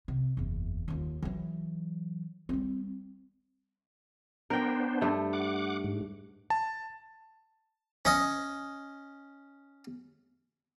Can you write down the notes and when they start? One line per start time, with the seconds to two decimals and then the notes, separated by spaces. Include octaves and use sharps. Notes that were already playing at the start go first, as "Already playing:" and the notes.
0.08 C3
0.37 F#1 E2
0.88 D#2 F4
1.22 E3 F#3
2.49 G3 C4
4.50 B3 D4 A#4 C5 G5
5.01 G2 A3
5.33 F#5 D6
5.84 G#2
6.50 A5
8.05 C#4 D#5